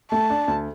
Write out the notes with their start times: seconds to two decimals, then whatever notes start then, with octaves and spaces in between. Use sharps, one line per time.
0.11 A3 A5
0.30 D4
0.48 D2